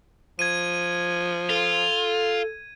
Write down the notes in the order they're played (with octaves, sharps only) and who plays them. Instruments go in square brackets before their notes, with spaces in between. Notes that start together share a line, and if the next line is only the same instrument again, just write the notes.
[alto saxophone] F3 [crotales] G#6 D#7
[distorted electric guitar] F4 [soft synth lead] A4